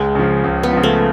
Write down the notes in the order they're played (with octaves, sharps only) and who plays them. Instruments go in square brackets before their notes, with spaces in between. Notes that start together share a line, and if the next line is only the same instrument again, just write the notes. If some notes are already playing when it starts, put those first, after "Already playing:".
Already playing: [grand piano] C#2 [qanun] G#3
[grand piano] C#3 F3
C#2
[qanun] B3
[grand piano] C#3 F3
[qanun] A3